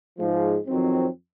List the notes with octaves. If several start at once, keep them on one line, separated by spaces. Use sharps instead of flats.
G#2 F3 G#3
F2 D#3 F#3 C4